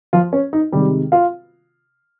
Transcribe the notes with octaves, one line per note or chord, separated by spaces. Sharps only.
F3 F4
C#4
D#4
C3 D#3 G3 G#3 G4
F4 F5